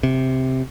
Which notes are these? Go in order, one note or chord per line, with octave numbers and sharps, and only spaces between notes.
C3